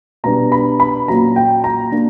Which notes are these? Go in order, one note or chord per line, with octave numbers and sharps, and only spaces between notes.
B2 G3 B3 D4 A#5
B5
B5
A#2 F#3 C#4 A#5
G5
A#5
A#2 A#3 D4